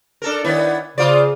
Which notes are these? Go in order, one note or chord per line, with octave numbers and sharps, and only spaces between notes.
D4 A4 A#4
D#3 B3 E4 C#5 D5
C#3 F4 C5 D5